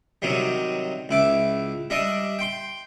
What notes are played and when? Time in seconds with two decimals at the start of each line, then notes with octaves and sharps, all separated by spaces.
0.22 C3 D#3 F#3 G3
1.09 C#2 E4 D6
1.90 G3 D4 D#5 E5
2.39 G5 C6